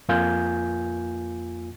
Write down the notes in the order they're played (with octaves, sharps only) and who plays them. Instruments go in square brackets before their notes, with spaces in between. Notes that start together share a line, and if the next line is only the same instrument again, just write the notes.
[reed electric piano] F2 A#3 F4 G#5 G6